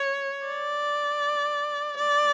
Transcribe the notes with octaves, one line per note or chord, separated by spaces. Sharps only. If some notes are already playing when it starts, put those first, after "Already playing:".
Already playing: C#5
D5
D5